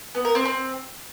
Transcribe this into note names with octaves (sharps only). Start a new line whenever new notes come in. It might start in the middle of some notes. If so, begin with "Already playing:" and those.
B3
A#4
C4
C4